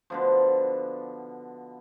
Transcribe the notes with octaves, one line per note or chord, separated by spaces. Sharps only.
B2 D3 F3